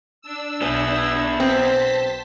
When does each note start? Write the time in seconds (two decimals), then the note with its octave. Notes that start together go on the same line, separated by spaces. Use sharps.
0.22 D4 E6
0.62 B1 B2 B3 G#4
1.40 C4 C5 A5 B6